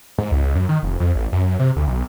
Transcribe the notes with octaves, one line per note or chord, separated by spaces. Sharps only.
G#2
C#2
F#2
D#3
F1
F2
A1
F#2
C3
D2
B1